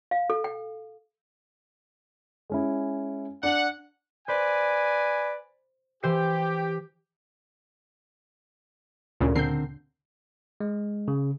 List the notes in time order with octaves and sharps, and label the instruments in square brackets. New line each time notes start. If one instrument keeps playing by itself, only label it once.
[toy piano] F5
A4
G5
[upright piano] G#3 C#4 E4
[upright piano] D4 [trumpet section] F#5
[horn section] B4 D5 G#5 [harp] C5
[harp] E3 C5 C7 [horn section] G4
[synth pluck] D2 A#2 C#3
[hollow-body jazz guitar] D3 C4 A#4 [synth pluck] G6 C7
[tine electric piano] G#3
C#3